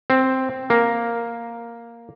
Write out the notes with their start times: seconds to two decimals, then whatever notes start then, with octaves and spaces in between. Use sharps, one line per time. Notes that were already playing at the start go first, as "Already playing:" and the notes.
0.10 C4
0.70 A#3